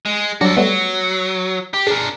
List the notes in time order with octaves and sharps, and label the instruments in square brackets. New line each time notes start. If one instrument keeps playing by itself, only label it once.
[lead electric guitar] G#3
[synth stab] F#3 G3 D4 [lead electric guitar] F#4 A4
[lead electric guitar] F#3 [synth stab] G3 A3 B3
[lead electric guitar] G4
[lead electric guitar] D4 A#4 [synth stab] G#4